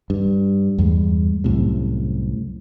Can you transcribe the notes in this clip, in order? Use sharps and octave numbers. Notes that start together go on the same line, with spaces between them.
G2
E2 G2 G#3
C2 F#2 A2 C3